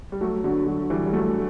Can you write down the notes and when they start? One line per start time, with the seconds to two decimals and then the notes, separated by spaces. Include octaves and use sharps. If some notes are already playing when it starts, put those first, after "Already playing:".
0.12 G3
0.21 F#3 A3
0.44 D3 F#3
0.66 D3 F#3
0.90 E3 G3
1.06 G3
1.13 F#3 A3